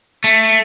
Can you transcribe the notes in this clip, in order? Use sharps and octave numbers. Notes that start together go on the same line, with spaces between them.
A3